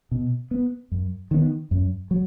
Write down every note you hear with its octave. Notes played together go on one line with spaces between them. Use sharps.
B2
B3
F#2
D#3 B3
F#2
F#3